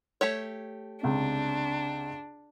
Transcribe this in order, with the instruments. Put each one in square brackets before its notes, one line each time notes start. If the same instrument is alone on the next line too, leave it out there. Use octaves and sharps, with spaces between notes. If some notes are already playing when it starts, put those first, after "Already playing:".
[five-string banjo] A3 G4 C#5
[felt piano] C#2 C3 [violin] D4